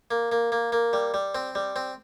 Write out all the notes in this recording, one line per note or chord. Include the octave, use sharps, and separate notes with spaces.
A#3
A#3
A#3
A#3
G3
G3
C4
G3
C4